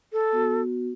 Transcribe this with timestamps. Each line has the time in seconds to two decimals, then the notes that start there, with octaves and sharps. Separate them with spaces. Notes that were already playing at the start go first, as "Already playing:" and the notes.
0.13 A4
0.33 B3 F#4